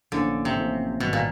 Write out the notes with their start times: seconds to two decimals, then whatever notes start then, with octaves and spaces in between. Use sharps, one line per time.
0.12 A1 A2 D3 F3 A#3 C#4
0.45 C3
0.55 A1 A2 F3 A#3 C#4
1.00 A1 G#2 B2 D#3 G3
1.13 A#2